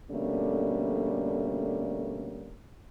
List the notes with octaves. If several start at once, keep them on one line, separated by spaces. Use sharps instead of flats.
B2 D3 G3 A3 A#3 C#4